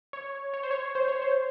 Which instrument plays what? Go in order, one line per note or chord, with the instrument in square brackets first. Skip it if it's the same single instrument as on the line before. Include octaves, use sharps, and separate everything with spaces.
[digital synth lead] C#5
C#5
C5
C#5
C5
C#5
C5